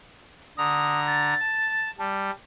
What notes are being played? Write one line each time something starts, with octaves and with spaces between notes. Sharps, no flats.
D3 A#5 D#6
A6
A5
G3 A5